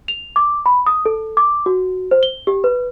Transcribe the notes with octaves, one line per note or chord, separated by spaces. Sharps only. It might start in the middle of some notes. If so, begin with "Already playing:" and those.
F7
D6
B5
D#6
A4
D6
F#4
C5
G7
G4
B4